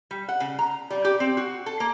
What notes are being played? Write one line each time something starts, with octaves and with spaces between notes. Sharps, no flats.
G3
F#5
C#3
A#5
G3
G4
C4
F#4
A4
A#3